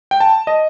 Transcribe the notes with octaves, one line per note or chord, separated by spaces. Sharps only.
G5
A5
D#5